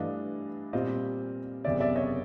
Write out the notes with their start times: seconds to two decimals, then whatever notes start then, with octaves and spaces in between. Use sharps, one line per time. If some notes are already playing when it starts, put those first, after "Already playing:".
Already playing: G2 E3 A3 D4 D#5 F5
0.73 A#2 G3 C4 F4 D#5 F5
1.64 F#1 E2 C3 D5 E5
1.80 D5 E5
1.96 C#5 D#5